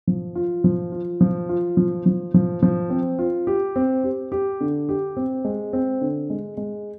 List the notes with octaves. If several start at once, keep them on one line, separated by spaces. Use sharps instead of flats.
F3
F4
F3
F4
F3
F4
F3
F3
F3
F3
C4
F4
G4
C4
G4
G4
D3
G4
C4
G#3
C4
D3
G#3
G#3